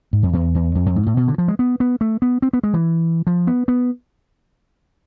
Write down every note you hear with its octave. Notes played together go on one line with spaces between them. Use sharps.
G#2
F2
E2
E2
F2
F2
G#2
A2
B2
D3
F3
G#3
B3
B3
A3
B3
C4
B3
G#3
E3
F3
B3
B3